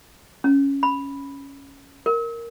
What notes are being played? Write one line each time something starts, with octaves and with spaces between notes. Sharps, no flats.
C#4
B5
A#4